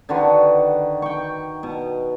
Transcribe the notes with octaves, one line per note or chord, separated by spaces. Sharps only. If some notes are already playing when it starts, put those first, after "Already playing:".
D3 D#3 F#4 B4
G5 C#6
B2